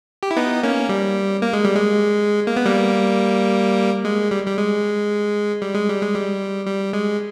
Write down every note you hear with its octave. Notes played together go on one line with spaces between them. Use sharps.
G4
E4
B3 D#4
A#3 C#4
G3
A#3
G#3
G3
G#3
A#3
B3
G3 A#3
G#3
G3
G3
G#3
G3
G#3
G3
G#3
G3
G3
G#3